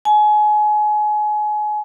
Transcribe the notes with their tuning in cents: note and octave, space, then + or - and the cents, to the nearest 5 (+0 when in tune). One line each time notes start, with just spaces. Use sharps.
G#5 +30